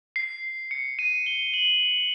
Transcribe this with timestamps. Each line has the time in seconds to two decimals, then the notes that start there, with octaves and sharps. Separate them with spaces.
0.16 C7
0.71 C#7
0.99 D#7
1.26 G7
1.54 F#7